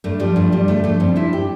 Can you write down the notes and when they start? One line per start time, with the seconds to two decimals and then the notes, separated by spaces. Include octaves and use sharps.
0.04 G2 A3
0.20 F3 G3
0.36 G2 A3
0.52 G2 G3
0.68 D3 A3
0.84 F3 A3
1.00 G2 C4
1.16 G2 E4
1.33 G4